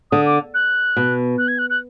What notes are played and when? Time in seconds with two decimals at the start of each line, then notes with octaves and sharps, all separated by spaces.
0.11 D3 D#6
0.26 D6
0.54 F#6
0.97 B2
1.38 F#6
1.48 G#6
1.59 F#6
1.70 F#6